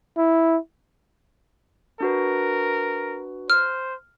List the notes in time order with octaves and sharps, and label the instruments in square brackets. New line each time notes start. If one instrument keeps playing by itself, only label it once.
[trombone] E4
[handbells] D4 F#4 B4 [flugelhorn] A#4
[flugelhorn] C5 [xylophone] F6